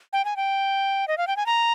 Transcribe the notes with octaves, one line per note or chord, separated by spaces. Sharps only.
G5
G#5
G5
D#5
F5
G5
G#5
A#5